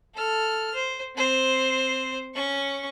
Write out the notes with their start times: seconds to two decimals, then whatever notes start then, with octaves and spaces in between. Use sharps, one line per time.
0.14 A4 F6
0.74 C5
1.16 C4 C5
2.35 C#4 C#6